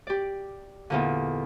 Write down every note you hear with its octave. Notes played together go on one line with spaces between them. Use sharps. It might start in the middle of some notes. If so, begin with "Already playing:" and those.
G4 D5
E2 A#2 D3